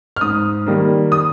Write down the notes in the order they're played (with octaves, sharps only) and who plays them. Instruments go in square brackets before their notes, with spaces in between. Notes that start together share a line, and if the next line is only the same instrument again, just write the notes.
[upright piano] F6
G#2 D#6
D#3 G3 A#3
D#6